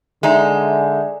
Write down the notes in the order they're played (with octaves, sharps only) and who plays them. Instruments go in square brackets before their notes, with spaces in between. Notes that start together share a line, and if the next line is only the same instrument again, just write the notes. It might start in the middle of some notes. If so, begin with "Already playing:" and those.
[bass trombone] D3 [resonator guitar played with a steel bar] G#3 D#4 [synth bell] D5 E5 G#5